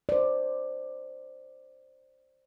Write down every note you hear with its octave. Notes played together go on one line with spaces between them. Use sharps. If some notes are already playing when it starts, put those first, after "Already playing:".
C5 D5